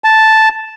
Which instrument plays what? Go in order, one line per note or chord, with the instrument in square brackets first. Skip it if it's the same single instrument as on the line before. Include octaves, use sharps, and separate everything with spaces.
[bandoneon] A5